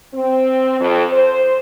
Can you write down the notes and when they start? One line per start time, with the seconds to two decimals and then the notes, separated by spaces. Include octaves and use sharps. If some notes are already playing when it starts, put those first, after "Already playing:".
0.14 C4
0.80 F2
1.13 C5